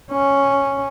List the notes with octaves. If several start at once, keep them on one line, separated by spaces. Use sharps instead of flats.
C#4